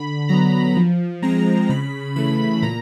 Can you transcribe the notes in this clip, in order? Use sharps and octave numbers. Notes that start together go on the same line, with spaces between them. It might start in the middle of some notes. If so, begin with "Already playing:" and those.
Already playing: D3 B5
F#3 B3 A#5
F3
G#3 C4 A#5
C#3 B5
E3 A3 B5
A#2 A#5